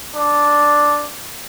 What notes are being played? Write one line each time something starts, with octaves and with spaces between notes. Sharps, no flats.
D4